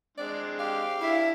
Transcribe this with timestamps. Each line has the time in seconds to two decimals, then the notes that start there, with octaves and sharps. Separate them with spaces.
0.18 G#3 C4 D4 D5
0.59 G4 F5
1.01 D4 E4 E5